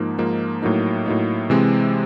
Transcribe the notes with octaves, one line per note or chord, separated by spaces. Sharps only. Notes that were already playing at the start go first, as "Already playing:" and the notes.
Already playing: G#2 F3 A#3 D#4
G#2 F3 A#3 D#4
A2 F#3 A#3 D#4
A2 F#3 A#3 D#4
C3 E3 G#3 C4